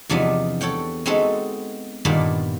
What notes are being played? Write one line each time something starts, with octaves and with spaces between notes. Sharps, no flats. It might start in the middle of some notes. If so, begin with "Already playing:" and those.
E2 C3 F3 B3 D4 D#4
A4 C#5 F#5 G5
G#3 B3 C4 D#4 F#4 A4
G2 A#2 D#3 A#3 B3 D4